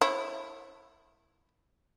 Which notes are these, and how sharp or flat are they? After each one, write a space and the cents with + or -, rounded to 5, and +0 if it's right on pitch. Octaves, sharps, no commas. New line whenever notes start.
E4 +0 C#5 -40